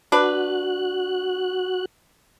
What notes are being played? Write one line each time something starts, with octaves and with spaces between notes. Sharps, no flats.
D4 F#4 B4 F#6